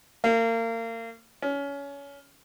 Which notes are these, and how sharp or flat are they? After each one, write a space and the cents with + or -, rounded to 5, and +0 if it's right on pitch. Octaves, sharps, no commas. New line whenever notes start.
A#3 -35
C#4 +25